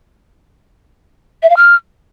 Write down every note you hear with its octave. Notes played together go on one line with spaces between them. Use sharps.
E5
F5
F6